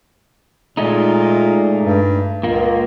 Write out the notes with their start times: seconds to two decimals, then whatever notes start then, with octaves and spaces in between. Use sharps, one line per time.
0.77 A#2 G#3 A3 D#4
1.82 G2
2.43 C#2 A#2 A#3